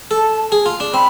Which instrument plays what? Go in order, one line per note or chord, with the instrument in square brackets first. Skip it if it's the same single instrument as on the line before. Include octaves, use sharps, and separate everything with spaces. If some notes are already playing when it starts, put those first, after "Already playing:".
[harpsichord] A4 [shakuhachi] A5
[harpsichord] G#4
F4
D4
[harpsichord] C4 [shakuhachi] B5